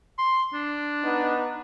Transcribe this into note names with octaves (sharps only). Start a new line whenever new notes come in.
C6
D4
B3 D#4